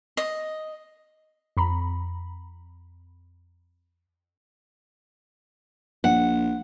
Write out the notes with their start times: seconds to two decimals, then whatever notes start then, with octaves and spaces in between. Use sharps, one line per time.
0.17 D#5
1.57 F2 A#5 B5
6.04 A#1 F#5